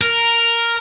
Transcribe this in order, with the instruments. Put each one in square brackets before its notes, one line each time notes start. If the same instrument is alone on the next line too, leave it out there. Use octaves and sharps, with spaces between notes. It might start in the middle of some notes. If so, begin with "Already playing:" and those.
[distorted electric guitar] A#4